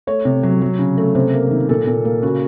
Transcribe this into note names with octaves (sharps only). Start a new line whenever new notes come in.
A3 C#5
C3
F#3
F#3
C#3
A3
C3 C5
A#3
D#3
A#2 A4
A#2
A#3
C#3 F#4